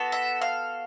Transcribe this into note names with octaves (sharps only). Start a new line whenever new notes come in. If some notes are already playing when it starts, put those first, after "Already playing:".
Already playing: B3 F#4 A4
E5
F5